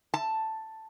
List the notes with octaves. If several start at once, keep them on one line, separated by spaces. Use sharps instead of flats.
A5